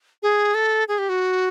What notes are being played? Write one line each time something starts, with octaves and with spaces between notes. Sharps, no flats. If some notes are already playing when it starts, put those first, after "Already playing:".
G#4
A4
G#4
G4
F#4